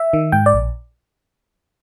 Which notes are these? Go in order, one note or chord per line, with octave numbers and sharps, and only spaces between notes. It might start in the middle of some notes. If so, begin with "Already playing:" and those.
Already playing: E5
D#3
G#2 G5
D5
A#1